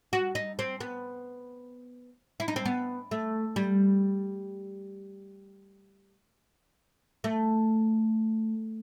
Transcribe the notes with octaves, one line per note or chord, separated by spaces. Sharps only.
F#4
D#4
C4
B3
E4
D#4
C4
B3
A3
G3
A3